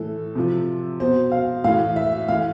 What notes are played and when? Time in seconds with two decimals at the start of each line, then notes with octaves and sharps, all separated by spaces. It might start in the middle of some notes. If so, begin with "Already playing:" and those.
Already playing: A2 E3 A4
0.35 C3 F3
1.00 B2 C5
1.32 F5
1.64 A2 E3 F5
1.96 E5
2.28 A2 E3 F5